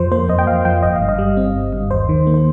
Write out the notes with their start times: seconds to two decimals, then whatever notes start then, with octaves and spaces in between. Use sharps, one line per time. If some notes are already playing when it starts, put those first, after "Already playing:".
Already playing: F2 F3 C5
0.11 A#3 C5
0.29 F2 D#5
0.39 G5
0.47 F2 F5
0.65 F3 G5
0.83 G1 D#5
0.96 F5
1.02 G2
1.09 D#5
1.19 G3
1.37 C4
1.55 G1
1.73 G2
1.91 D#2 C5
2.09 D#3
2.27 A#3
2.34 C5